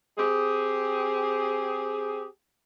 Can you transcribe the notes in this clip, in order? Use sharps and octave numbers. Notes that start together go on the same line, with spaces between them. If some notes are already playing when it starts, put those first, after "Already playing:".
C4 G4 G#4